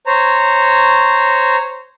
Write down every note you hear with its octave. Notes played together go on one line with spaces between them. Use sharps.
C5 C#5 A#5